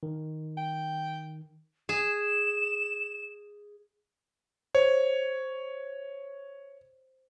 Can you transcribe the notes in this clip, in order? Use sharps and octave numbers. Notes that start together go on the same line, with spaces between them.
D#3
G5
G#4 E7
C5 C#5